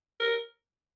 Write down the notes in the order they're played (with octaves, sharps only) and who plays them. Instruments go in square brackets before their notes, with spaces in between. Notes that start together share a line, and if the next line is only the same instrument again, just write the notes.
[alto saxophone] A#4